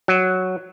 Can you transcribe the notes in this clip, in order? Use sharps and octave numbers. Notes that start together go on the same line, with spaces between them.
F#3